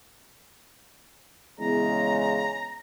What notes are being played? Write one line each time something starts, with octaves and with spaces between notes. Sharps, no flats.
E2 C#3 G#3 A#5